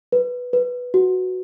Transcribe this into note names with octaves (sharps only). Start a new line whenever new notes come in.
B4
B4
F#4